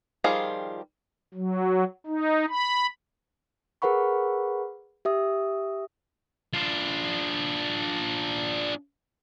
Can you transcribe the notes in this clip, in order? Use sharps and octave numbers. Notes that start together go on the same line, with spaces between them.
D#3 F3 G3 F4 G#4
F#3
D#4
B5
G#4 A#4 B4 F#5 B5 C#6
G4 E5 D#6
D4 F4